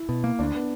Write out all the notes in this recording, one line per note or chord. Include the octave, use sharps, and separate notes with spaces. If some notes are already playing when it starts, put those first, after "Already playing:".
Already playing: E4
B2
A#3
D2 D4
B3